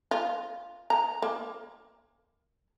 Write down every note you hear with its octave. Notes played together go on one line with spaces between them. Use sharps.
F4
A#5
A#3